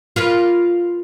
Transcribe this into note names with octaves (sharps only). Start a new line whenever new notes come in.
F4 A#4 B4